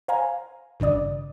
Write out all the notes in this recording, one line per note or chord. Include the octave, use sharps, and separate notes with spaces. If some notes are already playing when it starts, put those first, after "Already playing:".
C5 F5 G#5 A#5
G#1 G2 C#3 D5 D#6